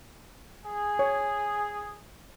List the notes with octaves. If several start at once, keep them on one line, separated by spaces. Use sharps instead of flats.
G#4
C#5